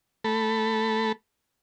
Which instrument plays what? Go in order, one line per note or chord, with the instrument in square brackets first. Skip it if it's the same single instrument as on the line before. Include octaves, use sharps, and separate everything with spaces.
[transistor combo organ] A3 A4 B5